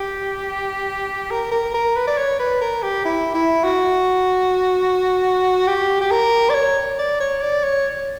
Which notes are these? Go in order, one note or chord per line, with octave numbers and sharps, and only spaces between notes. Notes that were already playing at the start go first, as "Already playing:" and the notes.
Already playing: G4
A#4
A#4
A#4
B4
D5
C#5
B4
A#4
G4
E4
E4
F#4
G4
G4
A#4
D5
C#5
D5
C#5
D5
C#5